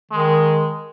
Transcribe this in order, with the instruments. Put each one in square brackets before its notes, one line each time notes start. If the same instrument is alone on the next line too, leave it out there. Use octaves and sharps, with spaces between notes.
[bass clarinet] D#3 [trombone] G#3